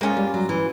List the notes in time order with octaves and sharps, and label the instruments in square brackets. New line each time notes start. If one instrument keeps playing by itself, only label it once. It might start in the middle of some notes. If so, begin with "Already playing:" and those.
[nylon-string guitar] G#3 [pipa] A#3 C#4 F4
[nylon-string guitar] G3
F#3
E3